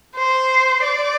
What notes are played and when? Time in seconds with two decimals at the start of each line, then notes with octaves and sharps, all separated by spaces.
0.16 C5
0.83 D5